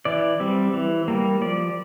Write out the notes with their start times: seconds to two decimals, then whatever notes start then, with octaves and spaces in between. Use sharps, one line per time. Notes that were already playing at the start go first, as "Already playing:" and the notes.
0.05 E3 D5
0.40 G3 C4
0.74 E3
1.08 G3 A#3
1.41 F3 D5